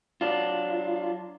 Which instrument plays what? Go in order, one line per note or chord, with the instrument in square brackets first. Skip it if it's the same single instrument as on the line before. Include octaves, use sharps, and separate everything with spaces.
[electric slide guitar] F#3 D4 F4